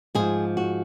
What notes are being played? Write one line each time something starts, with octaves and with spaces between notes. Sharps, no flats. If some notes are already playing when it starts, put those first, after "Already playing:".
G#2 F3 G#4
F#4